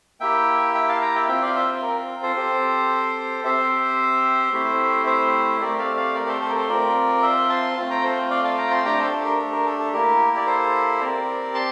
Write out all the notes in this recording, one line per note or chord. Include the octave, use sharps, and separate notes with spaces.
A#3 E4 G4 E5 G5
E5 G5
F5 A5
G5 A#5
E5 G5
C4 F4 E5 G5
D5 F5
C5 E5
A#4
A4 C5
C4 G4
C4 G4 C5 E5
A3 C4 E4 G4
C5 E5
A3 C4 G4 A#4 D5
D5 F5
D5 F5
A#4 D5
A4 C5
A4 C5
A#4
A4 C5
C4 F4 A#4 D5
C5 E5
A5 C6
A3 C4 F4
G5 A#5
A4 C5
D5 F5
F5 A5
G5 A#5
A5 C6
A3 D4 G4 G5 A#5
A4 C5
A4
A#4
A4
A#4
A4
A4
A#3 E4 G4 A#4
D5
A4 C5
C4 G4 A#4 D5
A5 C6